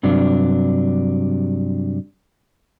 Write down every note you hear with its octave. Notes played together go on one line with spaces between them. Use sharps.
G2 C3 F#3 D4